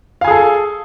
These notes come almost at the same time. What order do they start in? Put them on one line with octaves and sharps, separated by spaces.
F5 G#5 G#4 A4